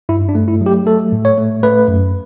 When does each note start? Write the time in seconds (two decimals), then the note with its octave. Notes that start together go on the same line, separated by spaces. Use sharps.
0.09 G2 E4
0.29 D4
0.35 A3
0.48 E4
0.61 F#3
0.66 G4
0.86 A3 A4
1.12 A2
1.25 C#5
1.38 A3
1.63 A3 B4
1.88 F#2